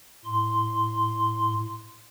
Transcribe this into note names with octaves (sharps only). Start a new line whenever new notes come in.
A2 C6